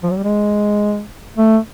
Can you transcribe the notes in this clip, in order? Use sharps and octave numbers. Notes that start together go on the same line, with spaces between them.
F3
F#3
G3
G#3
A3